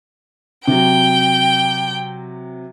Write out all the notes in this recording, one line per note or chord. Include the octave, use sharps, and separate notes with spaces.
C3 F#3 G5